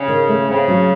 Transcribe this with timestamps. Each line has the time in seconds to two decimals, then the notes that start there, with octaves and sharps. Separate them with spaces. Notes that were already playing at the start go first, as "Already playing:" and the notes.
Already playing: C#3
0.08 D#3
0.28 A3
0.48 C#3 C4
0.68 F#3